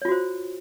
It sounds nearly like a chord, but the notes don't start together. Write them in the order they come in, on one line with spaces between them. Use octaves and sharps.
C#5 F4 F#4 C5